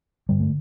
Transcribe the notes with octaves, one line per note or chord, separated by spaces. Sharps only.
G2 D3 G3
A3